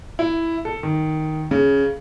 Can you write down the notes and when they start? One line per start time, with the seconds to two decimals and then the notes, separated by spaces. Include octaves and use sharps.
0.19 E4
0.65 A4
0.83 D#3
1.51 C#3